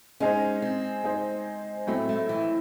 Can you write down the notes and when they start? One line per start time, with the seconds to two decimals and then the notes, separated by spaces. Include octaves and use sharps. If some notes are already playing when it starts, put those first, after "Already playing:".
0.20 G#3 C#4 D#4 G#4 C5
0.62 C4
1.04 G#3 D#4 G#4 C5
1.87 A2 F#3 A3 C4
2.09 A3
2.29 E3